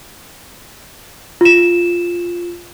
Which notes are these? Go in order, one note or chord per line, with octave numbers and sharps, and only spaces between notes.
F4 E7